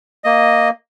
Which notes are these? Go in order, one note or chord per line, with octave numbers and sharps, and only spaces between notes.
A#3 D#5